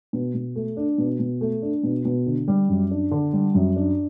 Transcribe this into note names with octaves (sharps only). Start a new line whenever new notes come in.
B2
B2
A3
D4
B2
B2
A3
D4
B2
B2
D3
G3
F#2
D4
D3
G3
F#2
D4